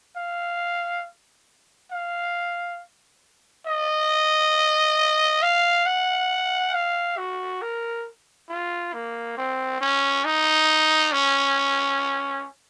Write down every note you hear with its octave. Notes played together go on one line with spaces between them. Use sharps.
F5
F5
D#5
F5
F#5
F5
F#4
A#4
F4
A#3
C4
C#4
D#4
C#4